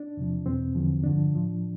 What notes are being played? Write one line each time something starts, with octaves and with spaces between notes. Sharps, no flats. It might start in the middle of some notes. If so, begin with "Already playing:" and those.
Already playing: D4
E2 C3 F3
E2 B2 C4
E2 D3 F3
G2 D3 F3 D4
A2 F3